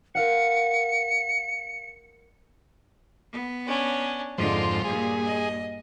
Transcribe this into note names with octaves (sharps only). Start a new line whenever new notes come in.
A#4 F5 F#5 C#7
B3
C#4 D4
F2 G#2 D3 G#3 F4 C5
G2 A#2 G#4
D#5